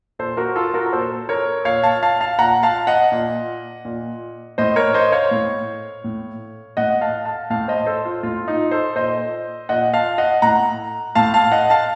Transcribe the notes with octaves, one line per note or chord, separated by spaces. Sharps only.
A#2 A4 C5
F#4 A#4
F4 A4
F#4 A#4
A#4
A#2 A4 C5
A#4 C#5
A#2 C#5 F5
F5 A5
F5 A5
F5 A5
A#2 F#5 A#5
F5 A5
D#5 F#5
A#2
A#2
A2 C5 D#5
A#4 C#5
C5 D#5
C#5 F5
A2
A2
A2 D#5 F#5
F5 A5
F5 A5
A2 F5 A5
C5 D#5
A4 C5
F4
A2 F4
D#4
A4 C5
A#2 C5 D#5
A#2 D#5 F#5
F5 A5
D#5 F#5
A2 F#5 A#5
A2 F5 A5
F5 A5
D#5 F#5
F5 A5